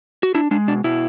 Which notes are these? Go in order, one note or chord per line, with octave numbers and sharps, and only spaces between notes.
F#4
D4 E4
G#3 D4
B2 D4
B2 E4